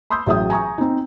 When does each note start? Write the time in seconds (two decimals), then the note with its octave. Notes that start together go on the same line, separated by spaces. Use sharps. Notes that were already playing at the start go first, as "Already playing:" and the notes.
0.10 B5 C6 D#6 E6 G6
0.26 A1 F#3 G#4 E5 G5 D#6
0.50 G#5 A#5 C#6 D#6
0.78 C4 D#4